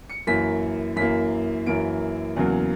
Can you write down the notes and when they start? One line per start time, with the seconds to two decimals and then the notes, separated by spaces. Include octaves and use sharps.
0.10 C#7
0.27 F#2 E3 A#3 B6
0.96 F#2 E3 A#3 B6
1.66 F#2 E3 A#3 D7
2.36 E2 C#3 F#3 A#3